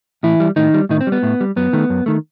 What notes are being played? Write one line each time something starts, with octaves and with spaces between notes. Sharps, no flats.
A2 E3 E4
G3
A2 D#3 D#4
G3
A2 D#3 D#4
C4
G3
B3
A2
G3
F#2 B3
D#3 A3
F#2
D#3 A3